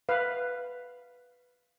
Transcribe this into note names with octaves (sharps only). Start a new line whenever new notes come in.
B4 F5